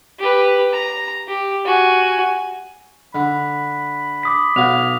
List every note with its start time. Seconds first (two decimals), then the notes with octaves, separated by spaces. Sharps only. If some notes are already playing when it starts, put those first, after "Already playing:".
0.20 G4 B4
0.73 A#5
1.28 G4
1.65 F#4 G#5
3.15 D3 B5
4.23 D6 D#6 B6
4.56 B1 F#3 F5 F7